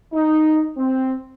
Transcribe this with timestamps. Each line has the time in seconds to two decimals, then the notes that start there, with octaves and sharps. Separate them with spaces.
0.14 D#4
0.78 C4